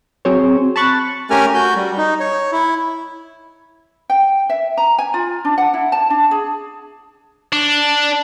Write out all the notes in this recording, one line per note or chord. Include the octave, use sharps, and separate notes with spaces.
F#3 C4 G#4 C5 C#5
A5 B5 C#6 F#6 A6
A3 C#4 G4 A#4 G#5 F6
F#4 G6
G3
D#4
C#5
E4
G5
E5
A#5
G#5
F4
D4
F#5
E4
A5
D4
G#4
D4